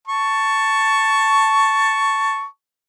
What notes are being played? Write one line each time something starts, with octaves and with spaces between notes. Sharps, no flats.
A5 C#6